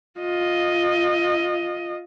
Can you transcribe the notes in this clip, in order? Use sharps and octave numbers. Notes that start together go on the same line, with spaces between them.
F4 D#5